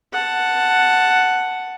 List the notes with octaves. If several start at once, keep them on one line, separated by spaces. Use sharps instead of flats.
F#5 A5